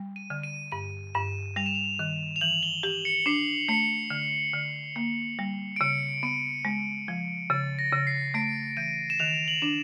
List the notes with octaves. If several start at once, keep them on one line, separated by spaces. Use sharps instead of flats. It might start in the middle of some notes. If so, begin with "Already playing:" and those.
Already playing: G3
D#7
D3
D#7
G2 D#7
G2 E7
G3 F7
E7
F7
D#3
F7
E3 F#7
G7
G4 F#7
C#7
D4 C7
A3 C#7
D3
D3
A#3
G3
D7
C#3 C#7
B3 D#7
G#3
F3
C#3 A6
A#6
C#3
C7
A3 D7
E3 D#7
E7
D#3 F7
F#7
D4